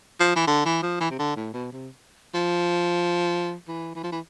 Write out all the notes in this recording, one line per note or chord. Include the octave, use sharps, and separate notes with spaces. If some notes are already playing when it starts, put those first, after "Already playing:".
F3
E3
D3
E3
F3
E3
C3
D3
A2
B2
C3
F3
E3
E3
F3
E3